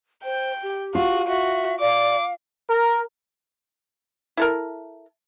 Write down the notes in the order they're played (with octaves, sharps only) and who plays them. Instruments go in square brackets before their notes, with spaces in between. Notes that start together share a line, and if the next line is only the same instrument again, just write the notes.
[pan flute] C5 [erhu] G5
[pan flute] G4
[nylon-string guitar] F4 [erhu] F#4
[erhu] F#4 [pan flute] E5
[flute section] D5 [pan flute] F5 [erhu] D6
[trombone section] A#4
[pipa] E4 A4 A#4